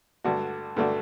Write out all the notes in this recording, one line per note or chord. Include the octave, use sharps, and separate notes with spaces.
G2 D3 A3 D4 F#4
G2 D3 A3 D4 F#4